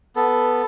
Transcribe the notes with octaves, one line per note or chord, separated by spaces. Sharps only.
B3 A4